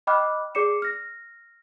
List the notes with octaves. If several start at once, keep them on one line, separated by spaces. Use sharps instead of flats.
D#5 G5 B5 D6 F6 F#6
G#4 D5 D6 C7 C#7 E7
F6 A#6